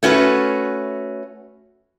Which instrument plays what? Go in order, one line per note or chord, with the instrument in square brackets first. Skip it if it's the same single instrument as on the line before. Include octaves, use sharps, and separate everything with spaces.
[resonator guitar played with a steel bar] A3 C#4 F#4 B4